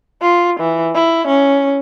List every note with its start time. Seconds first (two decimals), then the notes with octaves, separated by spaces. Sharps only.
0.22 F4
0.60 E3
0.94 E4
1.28 C#4